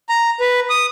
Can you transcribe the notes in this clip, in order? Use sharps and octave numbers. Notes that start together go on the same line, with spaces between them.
A#5
B4
D#6